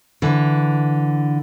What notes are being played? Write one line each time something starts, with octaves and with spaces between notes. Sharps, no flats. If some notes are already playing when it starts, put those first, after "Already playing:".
D3 E3